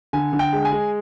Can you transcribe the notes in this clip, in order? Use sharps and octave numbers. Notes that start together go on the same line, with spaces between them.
D3 G#5
D3
G5
G#3
G#5
G#3